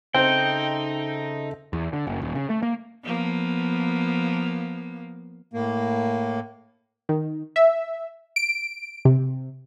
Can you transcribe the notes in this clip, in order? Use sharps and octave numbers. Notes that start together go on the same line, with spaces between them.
C#3 C4 D#4 A4 E5 G5
E2
D3
F#1
D#1
C#3
A3
A#3
F3 A#3 B3
A2 A#3
D#3
E5
D7
C3